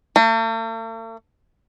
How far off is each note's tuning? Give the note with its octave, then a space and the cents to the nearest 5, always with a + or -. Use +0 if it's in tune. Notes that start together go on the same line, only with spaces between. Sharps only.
A3 +45